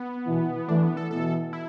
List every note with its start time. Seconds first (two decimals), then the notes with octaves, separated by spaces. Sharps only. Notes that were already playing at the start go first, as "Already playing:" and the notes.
Already playing: B3
0.26 B2 E3
0.68 E3 A3 D4
0.83 B3
0.97 A4
1.10 B2 E3 A4
1.53 E4